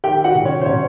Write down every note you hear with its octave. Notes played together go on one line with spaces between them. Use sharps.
D#3 G4 G5
F#4 F#5
C3
C#4 C#5
C5
C3 C#4 C#5